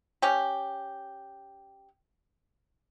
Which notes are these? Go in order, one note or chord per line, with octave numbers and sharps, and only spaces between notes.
C#4 G4